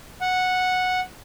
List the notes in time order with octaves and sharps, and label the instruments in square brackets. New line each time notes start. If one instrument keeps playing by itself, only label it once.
[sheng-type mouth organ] F#5